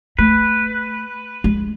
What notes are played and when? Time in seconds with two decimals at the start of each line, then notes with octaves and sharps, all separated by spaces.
0.19 A3 B4
1.44 G#3